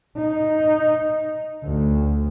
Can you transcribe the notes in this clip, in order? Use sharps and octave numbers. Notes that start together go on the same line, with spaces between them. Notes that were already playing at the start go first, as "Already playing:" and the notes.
D#4
D2